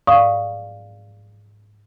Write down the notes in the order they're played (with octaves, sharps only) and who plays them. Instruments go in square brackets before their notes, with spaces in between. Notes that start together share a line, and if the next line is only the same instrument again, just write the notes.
[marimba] G#2 D5 F5 C#6 D#6